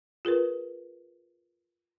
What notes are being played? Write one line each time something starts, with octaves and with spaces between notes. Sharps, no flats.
F4 G#4 A#4 B4